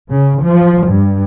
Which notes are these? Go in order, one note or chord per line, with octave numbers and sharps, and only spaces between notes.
C#3
F3
G2